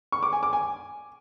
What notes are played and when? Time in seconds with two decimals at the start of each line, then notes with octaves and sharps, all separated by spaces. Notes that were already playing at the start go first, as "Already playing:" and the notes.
0.12 C#6
0.23 D6
0.33 G#5
0.43 D6
0.53 G#5